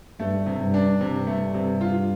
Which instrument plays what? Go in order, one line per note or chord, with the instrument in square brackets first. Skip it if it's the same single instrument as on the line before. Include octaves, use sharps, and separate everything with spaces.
[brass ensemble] G2 [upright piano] A3
[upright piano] C3
[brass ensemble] G2
[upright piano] D4
[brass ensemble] G2 [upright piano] C3
[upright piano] A3
C3
F4